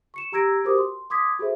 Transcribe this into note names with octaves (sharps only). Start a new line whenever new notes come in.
C#6 C#7 E7
G4 A#5 E6 G#6 A#6 D7
F#4 G4 A#4 C5 D6 D#6
C6
C6 D6 D#6 G#6 B6
F#4 G#4 A4 C5 E5